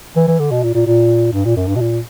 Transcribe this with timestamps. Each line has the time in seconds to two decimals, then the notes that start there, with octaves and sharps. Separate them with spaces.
0.16 E3
0.28 E3
0.39 D3
0.51 B2
0.63 A#2
0.74 A#2
0.86 A#2
1.33 G2
1.45 A#2
1.56 F#2
1.68 G2
1.75 B2
1.80 A#2